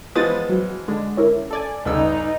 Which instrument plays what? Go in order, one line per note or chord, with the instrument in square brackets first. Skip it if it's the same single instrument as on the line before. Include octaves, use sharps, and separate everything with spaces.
[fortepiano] E3 F3 G#3 [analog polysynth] B3 B4 C5 [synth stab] D#6 A6
[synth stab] F#3
[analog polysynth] D3 G#3 [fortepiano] D4
[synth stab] C#4 E4 A#4
[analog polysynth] A4 D5 G#5
[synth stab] D2 C#3 [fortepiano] G2 B3 E6 [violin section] D#4